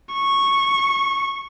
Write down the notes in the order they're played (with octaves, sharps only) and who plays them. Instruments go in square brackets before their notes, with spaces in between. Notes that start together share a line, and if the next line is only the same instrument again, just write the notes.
[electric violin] C#6